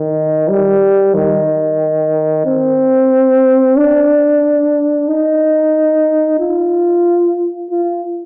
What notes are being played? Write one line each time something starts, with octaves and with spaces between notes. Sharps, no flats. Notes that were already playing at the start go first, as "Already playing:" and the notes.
Already playing: D#3
G3
D#3
C4
D4
D#4
F4
F4